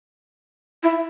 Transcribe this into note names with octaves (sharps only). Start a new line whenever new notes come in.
E4